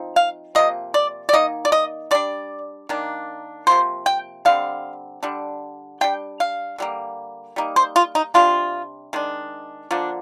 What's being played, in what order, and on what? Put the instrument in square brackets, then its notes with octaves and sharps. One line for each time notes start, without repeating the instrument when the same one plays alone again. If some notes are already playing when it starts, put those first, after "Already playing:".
Already playing: [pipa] F3 C4 D#4
F5
C3 F3 A#3 D#5
D5
D5
D#3 A#3 D#4 D#5
D5
D#5
G3 D4 D5
D#3 A#3 D4
C3 F3 A#3 C5
G5
D3 G3 C4 F5
D3 G3 D4
G3 D4 G5
F5
D3 G3 A#3
G3 A#3 D#4
C5
F4
D#4
C3 G3 D4 F4
D#3 G#3 D4
D3 F3 A#3 D4